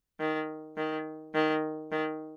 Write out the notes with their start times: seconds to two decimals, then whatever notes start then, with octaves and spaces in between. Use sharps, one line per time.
0.20 D#3
0.77 D#3
1.35 D#3
1.92 D#3